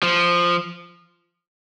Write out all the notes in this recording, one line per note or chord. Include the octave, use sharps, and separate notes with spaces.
F3